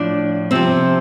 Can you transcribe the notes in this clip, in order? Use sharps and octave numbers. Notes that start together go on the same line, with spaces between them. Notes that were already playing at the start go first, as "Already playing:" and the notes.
Already playing: A2 F3 D4
C3 F3 C4